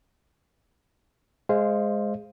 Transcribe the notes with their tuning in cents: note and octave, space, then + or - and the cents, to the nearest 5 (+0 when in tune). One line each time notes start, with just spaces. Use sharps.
G#3 +0 C5 +5 F5 -20